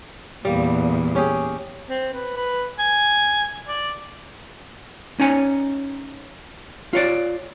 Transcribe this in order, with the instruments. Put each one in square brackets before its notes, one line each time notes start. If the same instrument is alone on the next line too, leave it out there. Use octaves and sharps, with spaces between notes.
[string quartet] E2 A#2 [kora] G3 A#3
[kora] C#4 G4 G#4
[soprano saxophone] C4
B4
B4
G#5
D5
[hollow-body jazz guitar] C#4 D#4 C#5 G#5
F4 C#5 D5